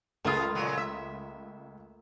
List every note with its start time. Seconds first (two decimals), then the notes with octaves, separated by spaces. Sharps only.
0.25 C#2 F#2 A3 A#3 F4 G#4 D#6
0.55 A#2 F#3
0.78 E5